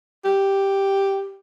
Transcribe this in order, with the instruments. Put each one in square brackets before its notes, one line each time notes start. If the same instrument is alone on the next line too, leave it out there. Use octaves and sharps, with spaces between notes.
[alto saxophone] G4